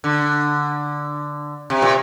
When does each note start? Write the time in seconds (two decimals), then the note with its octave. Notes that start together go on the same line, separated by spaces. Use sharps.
0.04 D3
1.70 C3
1.82 A#2